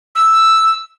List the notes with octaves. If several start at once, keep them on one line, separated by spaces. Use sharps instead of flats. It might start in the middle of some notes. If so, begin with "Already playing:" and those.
E6